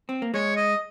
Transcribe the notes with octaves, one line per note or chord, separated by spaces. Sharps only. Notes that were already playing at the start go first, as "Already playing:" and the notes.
C4
A#3
G#3 C#5
D#5